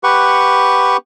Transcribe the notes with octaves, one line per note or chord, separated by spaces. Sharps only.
G4 B4 F#5 C#6